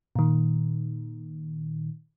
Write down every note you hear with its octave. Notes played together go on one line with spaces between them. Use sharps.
A#2 D#3